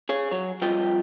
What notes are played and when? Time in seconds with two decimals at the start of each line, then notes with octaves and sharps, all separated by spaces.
0.09 G#4 C#5
0.31 F#3 C#5
0.62 F2 G3 F4 G4 D#5 G5